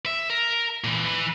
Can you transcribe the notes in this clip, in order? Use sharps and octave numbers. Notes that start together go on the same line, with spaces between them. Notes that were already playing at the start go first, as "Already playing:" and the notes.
E5
A#4
A#2 E3
E3 B4